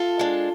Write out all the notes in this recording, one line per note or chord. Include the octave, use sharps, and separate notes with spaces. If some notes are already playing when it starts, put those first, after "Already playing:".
Already playing: F4 A4
G#3 D4